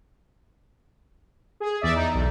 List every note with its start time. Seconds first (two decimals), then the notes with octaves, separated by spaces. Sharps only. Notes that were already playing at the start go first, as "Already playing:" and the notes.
1.60 G#4
1.81 E2 D5 E5
1.96 D#4
2.14 B1